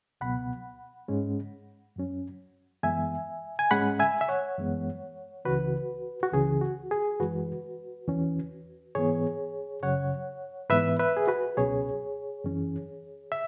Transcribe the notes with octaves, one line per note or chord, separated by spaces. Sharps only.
C#2 B2 F#3 B3 F#5 B5
G#2 G#3 C#4
F#2 F#3 C#4
F#2 E3 G#3 B3 E5 G#5
G#5
G#2 G#3 C#4 F#5 B5
E5 G#5
E5
C#5 F#5
F#2 E3 G#3 B3
C#2 C#3 E3 F#4 B4
F#4
C#2 C#3 E3 G#4
F#4
G#4
F#2 E3 G#3 F#4 B4
E2 E3 C#4
G#2 E3 B3 G#4 C#5
F#2 C#3 F#3 C#5 F#5
G#2 E3 B3 B4 E5
B4 E5
G#4
F#4 B4
C#2 B2 F#3 C#4 G#4 C#5
F#2 E3 C#4
E5